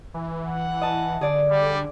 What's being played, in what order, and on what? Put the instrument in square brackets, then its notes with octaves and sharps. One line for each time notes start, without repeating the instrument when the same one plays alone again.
[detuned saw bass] E3
[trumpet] F#5
[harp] D#5 A5
[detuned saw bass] D3 [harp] G#4 D5
[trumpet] G3